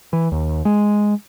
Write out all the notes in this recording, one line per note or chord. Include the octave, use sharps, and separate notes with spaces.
E3
D#2
G#3